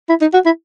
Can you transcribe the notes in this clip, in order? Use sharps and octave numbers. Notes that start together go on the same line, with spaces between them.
E4
D#4
F#4
E4